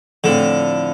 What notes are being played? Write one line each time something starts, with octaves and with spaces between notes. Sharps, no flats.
A2 D3 F3 C4